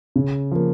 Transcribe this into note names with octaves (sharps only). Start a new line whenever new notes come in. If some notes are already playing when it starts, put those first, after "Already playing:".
C#3
F3 A#3